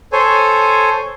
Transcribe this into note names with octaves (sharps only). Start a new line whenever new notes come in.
A4 C5 C#5 G#5